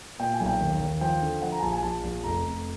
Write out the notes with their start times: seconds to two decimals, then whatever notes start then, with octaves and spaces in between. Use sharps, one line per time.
0.19 A#2 G5
0.34 G#5
0.40 B1
0.46 G5
0.60 D#2
0.81 D#2
1.01 F3 G5
1.22 D3
1.42 F3 F#5
1.52 A#5
1.59 G#5
1.62 A#1 A5
1.72 G#5
1.83 A#1 A5
2.03 A#1
2.24 F1 A#5
2.45 F1